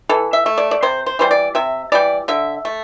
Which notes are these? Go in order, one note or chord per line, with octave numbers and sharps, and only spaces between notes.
E3 A4
E5
A3
D5
D5
C3 C5
C5
E3 G3 C5
D5
C3 E5
E3 G3 D5
D3 E5
A3